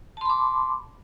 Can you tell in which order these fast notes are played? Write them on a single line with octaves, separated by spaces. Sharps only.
A5 C6 B5 D6